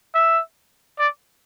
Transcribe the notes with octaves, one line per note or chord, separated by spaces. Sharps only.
E5
D5